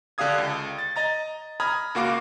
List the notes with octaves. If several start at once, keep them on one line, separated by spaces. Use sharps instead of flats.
D3 D4 G4 F5 D#6 G#6
C#2
A6
D#5 A#5 A6
A#5 B5 D#6 F6 G#6
C#2 A#3 F#4 F5 D6 D7